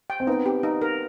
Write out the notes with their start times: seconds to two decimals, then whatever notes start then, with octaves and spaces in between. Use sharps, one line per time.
0.10 G5
0.20 C4
0.27 B3 D#4
0.46 G4
0.63 D#4
0.82 A#4